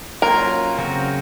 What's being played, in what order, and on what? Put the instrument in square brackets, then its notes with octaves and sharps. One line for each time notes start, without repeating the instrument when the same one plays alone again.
[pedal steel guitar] F#3 A#3 C#4 F4 [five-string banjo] A#4
[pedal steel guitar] C#3 F#3 C4 F#4 A#4